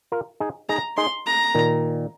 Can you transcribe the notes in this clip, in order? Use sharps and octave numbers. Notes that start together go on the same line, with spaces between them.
F4 A#4
D#4 G#4
D#4 G#4 A#5
D#4 G#4 C6
A#5
A#2 D#3